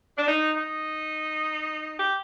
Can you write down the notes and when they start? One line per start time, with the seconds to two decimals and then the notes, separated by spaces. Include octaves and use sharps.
0.16 D4
0.27 D#4
0.55 D#4
1.99 G4